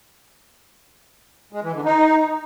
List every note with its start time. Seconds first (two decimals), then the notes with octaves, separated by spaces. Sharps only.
1.53 G#3
1.63 E3
1.74 D3
1.84 D#4